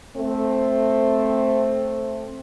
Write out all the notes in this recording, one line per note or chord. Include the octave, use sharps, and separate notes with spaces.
A3 C4